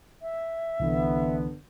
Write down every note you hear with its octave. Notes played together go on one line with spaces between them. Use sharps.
E5
C2 D3 E3 B3